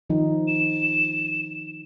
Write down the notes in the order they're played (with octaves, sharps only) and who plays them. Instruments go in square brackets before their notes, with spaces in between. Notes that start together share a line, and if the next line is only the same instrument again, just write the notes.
[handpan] D#3 F3 D#4
[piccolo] E7